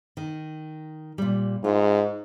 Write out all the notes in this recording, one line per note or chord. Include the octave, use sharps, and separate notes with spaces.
D#3
A#2 G3
G#2 F4